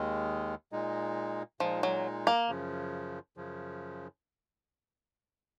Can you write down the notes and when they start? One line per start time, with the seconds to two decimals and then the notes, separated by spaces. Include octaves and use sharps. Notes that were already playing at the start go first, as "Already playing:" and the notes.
Already playing: D#2 D#3 G#3
0.72 A#2 G#3 D#4
1.60 A#2 F3 G#3 D#4
1.83 F#3
2.27 A#3
2.49 F#2 C#3 F3
3.37 F#2 C#3 F3